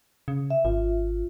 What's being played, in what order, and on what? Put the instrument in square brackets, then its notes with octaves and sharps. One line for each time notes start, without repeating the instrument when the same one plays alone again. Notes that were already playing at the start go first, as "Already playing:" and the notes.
[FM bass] C#3
[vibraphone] E5
[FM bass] G#1 [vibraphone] F4